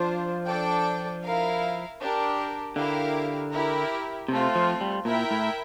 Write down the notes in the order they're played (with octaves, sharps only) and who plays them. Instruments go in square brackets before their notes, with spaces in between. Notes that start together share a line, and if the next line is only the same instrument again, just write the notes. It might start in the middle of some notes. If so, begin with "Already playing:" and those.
Already playing: [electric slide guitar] F3 [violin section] D4 F4 C5
[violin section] D4 A4 D5 G5
E4 A#4 F5
D4 G4 A#4
[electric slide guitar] D3 [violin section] E4 G4 A#4 F5
[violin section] E4 G4 A#4
[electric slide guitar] C3 [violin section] A3 C4 F4
[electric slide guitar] F3
G3
[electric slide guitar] A#2 [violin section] E4 A#4 E5 G5
[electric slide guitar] A2